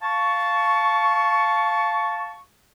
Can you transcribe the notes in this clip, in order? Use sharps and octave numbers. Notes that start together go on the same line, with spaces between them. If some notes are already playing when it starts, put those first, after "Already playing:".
F5 A5 C#6